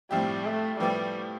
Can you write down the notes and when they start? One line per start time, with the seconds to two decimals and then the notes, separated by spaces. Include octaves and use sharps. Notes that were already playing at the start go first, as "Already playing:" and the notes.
0.11 A2 F3 G3 C4 E4 G4
0.45 A3
0.80 A2 F3 G3 B3 E4 G4